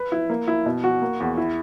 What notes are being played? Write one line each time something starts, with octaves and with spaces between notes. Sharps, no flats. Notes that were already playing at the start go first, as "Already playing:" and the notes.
Already playing: B4
E4
A#3
E4
B2
F#4
A#3
E2
E4